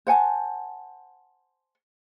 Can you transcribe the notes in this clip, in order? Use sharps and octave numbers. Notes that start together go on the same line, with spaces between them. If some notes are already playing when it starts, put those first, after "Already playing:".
C5 F#5 G#5 A5